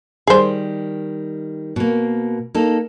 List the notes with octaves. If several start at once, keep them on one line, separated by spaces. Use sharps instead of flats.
D#3 G3 G#4 C5
B2 A#3
A#3 D#4 A4